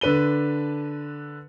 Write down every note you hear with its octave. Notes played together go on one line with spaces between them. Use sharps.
D3 D4 B4 D#7 G7